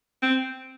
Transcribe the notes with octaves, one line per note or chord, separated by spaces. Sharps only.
C4